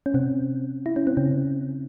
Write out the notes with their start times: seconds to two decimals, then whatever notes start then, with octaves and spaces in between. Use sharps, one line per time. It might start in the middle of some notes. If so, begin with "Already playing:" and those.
0.06 C#4
0.14 C3 C4
0.86 E4
0.96 C#4
1.07 C4
1.17 C#3 C#4